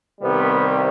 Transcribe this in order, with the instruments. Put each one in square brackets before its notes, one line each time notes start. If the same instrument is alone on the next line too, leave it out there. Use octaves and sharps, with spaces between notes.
[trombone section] C2 C3 D#3 G3 B3